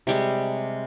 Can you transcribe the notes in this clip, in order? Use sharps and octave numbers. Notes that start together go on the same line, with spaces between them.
C3 G3 G#3